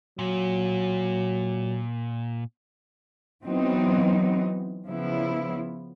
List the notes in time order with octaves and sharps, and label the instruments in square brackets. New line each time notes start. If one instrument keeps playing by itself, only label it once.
[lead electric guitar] A#2 [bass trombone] F#3
[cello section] E3 F#3 B3 C4 D#4
C#3 F3 B3 E4